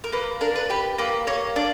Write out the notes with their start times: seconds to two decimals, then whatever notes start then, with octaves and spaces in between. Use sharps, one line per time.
0.04 A#4
0.12 A#3 B4
0.41 D4 A#4
0.56 B4
0.70 G4 B4
0.98 A#3 B4
1.27 A#3 C#5
1.56 D4 D5